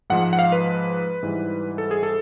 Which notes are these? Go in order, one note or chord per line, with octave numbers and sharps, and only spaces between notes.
G#2 F3 G#3 F#5
F#5
F5
B4
G#2 E3 G3
A4
G#4
A4